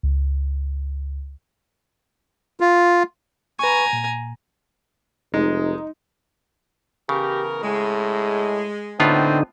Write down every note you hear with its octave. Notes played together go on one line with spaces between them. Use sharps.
C#2
F4
B4 G#5 A#5 C#6
A#2
F1 G#3 D#4
C#3 E3 B3 G4 A#4
A2 G#3
A2 D3 B3 C4 D#4 F4